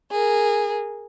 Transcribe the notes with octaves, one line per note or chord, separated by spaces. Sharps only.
G#4 A#4